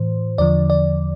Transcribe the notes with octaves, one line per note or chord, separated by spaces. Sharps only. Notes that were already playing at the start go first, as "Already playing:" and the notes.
Already playing: A2 E3 C5
E2 D3 F3 D5
D5